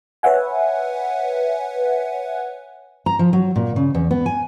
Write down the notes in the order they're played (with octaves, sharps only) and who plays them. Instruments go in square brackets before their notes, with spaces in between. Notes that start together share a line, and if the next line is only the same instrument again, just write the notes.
[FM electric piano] B4 C#5 E5 F#5 G#5
[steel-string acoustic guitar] A#5
F3
F#3
A#2
C#3
E2
B3
G#5